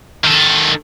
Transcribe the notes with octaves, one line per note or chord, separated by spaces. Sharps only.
D#3 A4